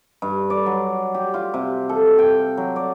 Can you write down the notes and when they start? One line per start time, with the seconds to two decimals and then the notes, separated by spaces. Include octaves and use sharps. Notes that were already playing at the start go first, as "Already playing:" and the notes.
0.22 G2
0.50 D5
0.66 F#3
1.14 G4
1.34 F4
1.54 C3
1.89 A4
2.19 G5
2.57 F#3
2.76 D5